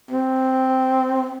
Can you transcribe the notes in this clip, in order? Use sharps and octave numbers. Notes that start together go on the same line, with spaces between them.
C4